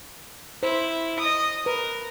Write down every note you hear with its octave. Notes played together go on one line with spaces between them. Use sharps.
E4 C5
D#5 D#6
A#4 B4